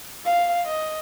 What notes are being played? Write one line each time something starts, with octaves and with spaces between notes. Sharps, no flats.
F5
D#5